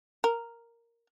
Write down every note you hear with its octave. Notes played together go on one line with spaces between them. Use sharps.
A#4